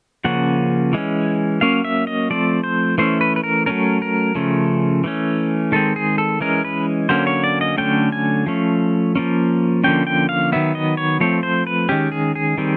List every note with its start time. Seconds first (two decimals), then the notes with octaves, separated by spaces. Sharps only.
0.24 C#3 F3 A#3 C#4 F#5
0.93 E3 G#3 C#4
1.61 F#3 A#3 C#4 F5
1.85 E5
2.07 D#5
2.30 F3 A3 C4 D5
2.64 C5
2.98 E3 A3 C#4 C5
3.21 B4
3.36 B4
3.44 A#4
3.66 F#3 A3 C#4 A#4
4.02 A#4
4.35 C#3 F3 A3 C#4
5.04 E3 A3 C#4
5.72 D#3 G#3 C4 A4
5.96 G#4
6.18 A4
6.40 E3 G#3 C#4 A#4
6.65 B4
7.09 D3 F#3 A#3 C#4 C5
7.27 C#5
7.44 D5
7.61 D#5
7.78 D3 F#3 A3 C#4 G5
8.12 G#5
8.46 F3 A3 C#4
9.16 F3 A#3 C#4
9.84 D3 F3 A#3 C#4 G5
10.07 G5
10.29 F5
10.52 D#3 F#3 B3 E5
10.75 D#5
10.97 C#5
11.21 F3 A3 C4 C#5
11.43 C5
11.67 B4
11.89 D#3 G#3 C#4 G4
12.12 G#4
12.35 G#4
12.58 D#3 G3 C4